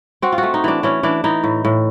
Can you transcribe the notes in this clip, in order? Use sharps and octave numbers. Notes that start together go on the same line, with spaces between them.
C4 F#4
F4
F#4
A3
D#4
E3 D4
E3 C#4
E3 D4
E3 D#4
A2
A2